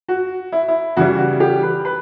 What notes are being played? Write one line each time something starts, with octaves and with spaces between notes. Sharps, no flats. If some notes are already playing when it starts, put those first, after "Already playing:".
F#4
E4
E4
C#3 E3 G3 F#4
F#4
G4
B4
B4